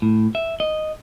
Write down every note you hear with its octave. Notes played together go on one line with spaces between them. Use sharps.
A2
E5
D#5